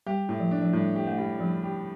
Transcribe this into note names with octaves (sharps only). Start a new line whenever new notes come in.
G3 G4
A2
F3
D4
F3
A2 G3
G4
A3
G3
F3 G3
G4